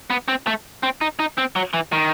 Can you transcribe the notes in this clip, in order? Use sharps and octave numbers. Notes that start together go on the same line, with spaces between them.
B3
C4
A3
C4
D#4
D#4
C4
F#3
E3
D#3